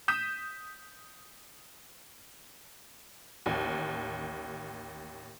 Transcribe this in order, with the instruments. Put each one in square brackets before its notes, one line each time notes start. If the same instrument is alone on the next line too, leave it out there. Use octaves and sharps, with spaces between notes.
[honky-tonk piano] D#6 G6 B6 E7
A1 D#2